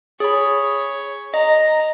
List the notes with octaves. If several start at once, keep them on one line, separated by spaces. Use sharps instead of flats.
G#4 C#5 B5
D#5 A#5